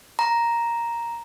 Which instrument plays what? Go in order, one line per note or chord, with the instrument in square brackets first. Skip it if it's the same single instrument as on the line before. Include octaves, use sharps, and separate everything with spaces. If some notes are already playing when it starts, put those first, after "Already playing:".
[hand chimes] A#5